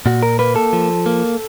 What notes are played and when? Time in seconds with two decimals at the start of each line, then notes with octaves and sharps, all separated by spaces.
0.06 A#2 F#4
0.23 A#4
0.39 A#3 B4
0.56 A4
0.73 F3
1.06 A#3